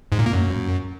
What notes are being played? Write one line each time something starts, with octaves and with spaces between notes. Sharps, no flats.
G#2
A#2
A#3
F#2